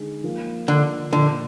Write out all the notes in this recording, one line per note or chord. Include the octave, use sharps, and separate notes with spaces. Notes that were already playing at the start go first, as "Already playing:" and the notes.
Already playing: D3 G#3 D#4 G#4
F3 A#3 F4
D3
A#2 D3 F3 A#3 D4